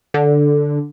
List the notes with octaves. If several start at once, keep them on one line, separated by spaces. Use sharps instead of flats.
D3